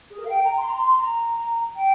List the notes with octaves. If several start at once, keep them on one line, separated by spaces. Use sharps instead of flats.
G#4
A#4
F5
G5
A#5
C6
A#5
C6
C6
A#5
G5